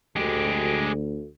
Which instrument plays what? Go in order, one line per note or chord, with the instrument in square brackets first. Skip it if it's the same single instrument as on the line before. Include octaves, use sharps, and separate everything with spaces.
[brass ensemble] D2 [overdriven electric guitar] G#3 G4